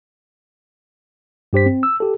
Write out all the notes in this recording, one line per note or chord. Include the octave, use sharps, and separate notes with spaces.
G2 G4 C5 B6
C4
E6
G4 A4